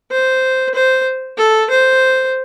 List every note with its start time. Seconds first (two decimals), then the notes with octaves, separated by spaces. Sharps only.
0.11 C5
0.75 C5
1.38 A4
1.70 C5